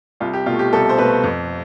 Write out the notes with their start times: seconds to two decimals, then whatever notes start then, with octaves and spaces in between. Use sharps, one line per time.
0.20 C2 F4
0.33 G4
0.46 B2 A3 F4
0.59 G4
0.73 C2 A4
0.89 C5
0.98 B2 A3 B4
1.23 F2